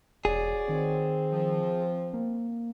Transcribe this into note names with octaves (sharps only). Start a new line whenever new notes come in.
E1 F#4 G#4 C#5 D5
D#3 C4
F3
A#3